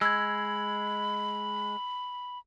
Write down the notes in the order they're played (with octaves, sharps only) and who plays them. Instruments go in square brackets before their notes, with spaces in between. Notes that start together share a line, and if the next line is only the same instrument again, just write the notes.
[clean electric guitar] G#3 [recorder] B5 [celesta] E6 G#6